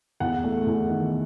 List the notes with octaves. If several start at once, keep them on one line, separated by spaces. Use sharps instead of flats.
E2 F#5
A3
E2
D#3